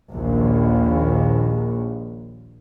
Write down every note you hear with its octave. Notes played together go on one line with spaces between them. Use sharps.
A#1 D#2